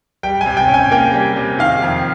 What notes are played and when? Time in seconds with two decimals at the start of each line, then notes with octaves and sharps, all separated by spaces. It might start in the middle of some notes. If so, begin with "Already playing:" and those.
0.23 G3 G5
0.41 G#5
0.46 C3
0.57 G5
0.68 C#4
0.74 G#5
0.91 A#3 G5
1.14 G3
1.36 C3
1.59 D#3 F5
1.82 F2